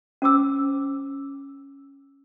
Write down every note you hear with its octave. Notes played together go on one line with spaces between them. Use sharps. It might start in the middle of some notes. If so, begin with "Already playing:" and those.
C#4 C5 D6 E6